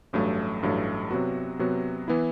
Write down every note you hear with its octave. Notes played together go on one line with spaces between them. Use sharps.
A1 G2 F#3 A3
A1 G2 F#3 A3
C3 F#3 B3 F#4
C3 F#3 B3 F#4
E3 B3 E4